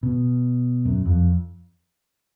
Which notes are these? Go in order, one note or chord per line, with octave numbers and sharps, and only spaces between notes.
B2
F#2
F2